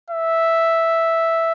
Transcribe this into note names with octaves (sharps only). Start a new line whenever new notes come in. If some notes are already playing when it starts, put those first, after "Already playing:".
E5